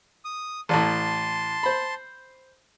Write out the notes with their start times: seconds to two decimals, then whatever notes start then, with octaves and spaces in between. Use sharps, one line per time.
0.25 D#6
0.69 A1 A2 A5 C6
1.63 C5 B5